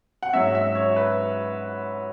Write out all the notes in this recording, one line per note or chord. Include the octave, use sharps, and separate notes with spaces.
F#5
G#2 F#3 C#4 E5
E5
C#5
B4